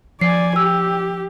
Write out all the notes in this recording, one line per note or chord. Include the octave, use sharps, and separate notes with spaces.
F3 D5 G#5 C7
G4 E6